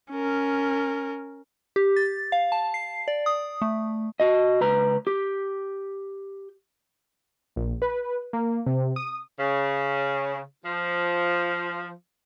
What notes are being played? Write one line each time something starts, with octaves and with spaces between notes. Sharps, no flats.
C#4 A#4
G4
A6
F5
A5
C7
D5
D#6
A3
F#4 D#5
C#2 B4 A#5
G4
A#1
B4
A#3
C3
D#6
C#3
F3